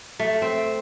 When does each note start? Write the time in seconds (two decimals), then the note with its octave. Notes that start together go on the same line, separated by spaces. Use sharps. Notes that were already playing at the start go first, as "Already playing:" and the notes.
0.20 A3
0.42 C4